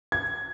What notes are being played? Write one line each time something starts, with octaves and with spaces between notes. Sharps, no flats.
G#6